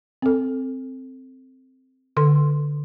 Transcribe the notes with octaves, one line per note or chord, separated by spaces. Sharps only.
C4 A4
D3 A4 C6